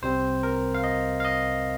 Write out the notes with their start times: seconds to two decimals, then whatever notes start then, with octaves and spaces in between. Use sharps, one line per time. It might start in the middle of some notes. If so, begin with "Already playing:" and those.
0.02 C2 C3 G3 C4 C5
0.43 A#4
0.74 F5
0.84 D#5
1.20 F5
1.25 D#5